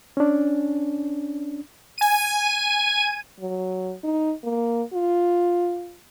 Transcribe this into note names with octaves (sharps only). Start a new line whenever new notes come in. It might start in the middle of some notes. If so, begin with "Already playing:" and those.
C#4 D4
G#5 D#7
F#3
D#4
A#3
F4